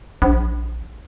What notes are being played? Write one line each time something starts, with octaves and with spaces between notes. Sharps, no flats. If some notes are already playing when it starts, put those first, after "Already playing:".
A#1